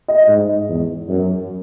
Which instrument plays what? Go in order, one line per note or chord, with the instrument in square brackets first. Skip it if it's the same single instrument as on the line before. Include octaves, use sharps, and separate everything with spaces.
[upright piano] D#5
[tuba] G#2
E2
F#2